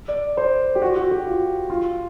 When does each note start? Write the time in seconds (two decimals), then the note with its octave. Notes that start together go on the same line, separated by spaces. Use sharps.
0.08 D5
0.37 C5
0.75 G4
0.82 F#4
0.96 F#4
1.11 G4
1.26 F4
1.70 F4